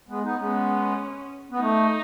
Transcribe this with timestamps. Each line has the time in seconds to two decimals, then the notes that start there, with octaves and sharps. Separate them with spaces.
0.09 G#3 B3
0.23 B3 D#4
0.39 G#3 B3 C#4
1.51 B3
1.60 A3 D#4